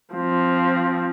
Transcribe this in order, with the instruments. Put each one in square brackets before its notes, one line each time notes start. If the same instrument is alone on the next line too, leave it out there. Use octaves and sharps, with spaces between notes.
[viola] F3 C4